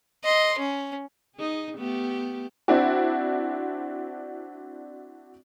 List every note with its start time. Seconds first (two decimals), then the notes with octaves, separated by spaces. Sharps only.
0.24 D#5 C6
0.58 C#4
1.36 D#4 G#4
1.78 A3 B3 G4
2.68 C4 D4 E4 F#4